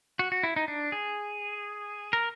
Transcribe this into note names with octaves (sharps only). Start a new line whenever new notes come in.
F#4
F#4
E4
D#4
D4
G#4
A#4